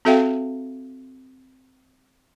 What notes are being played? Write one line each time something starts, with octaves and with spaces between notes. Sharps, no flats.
C4 F#4 A4 E5 F5 G5